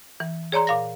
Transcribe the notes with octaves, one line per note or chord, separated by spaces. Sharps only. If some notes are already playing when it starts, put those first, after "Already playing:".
E3
G#4 C#5 D5 A#5 C6
A#2 F5 A#6